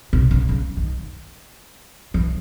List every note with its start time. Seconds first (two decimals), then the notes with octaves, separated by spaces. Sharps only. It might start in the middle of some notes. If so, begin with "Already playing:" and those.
0.13 C3
0.31 C#3
0.49 C#3
0.77 D#3
2.14 E3